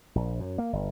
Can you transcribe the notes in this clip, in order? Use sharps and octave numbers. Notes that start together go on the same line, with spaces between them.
A#1
F#2
A#3
G1